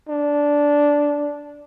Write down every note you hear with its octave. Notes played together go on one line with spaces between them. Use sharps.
D4